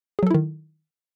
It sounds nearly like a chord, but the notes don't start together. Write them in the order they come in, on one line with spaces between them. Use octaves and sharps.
G#4 F#3 A4 E4 D#3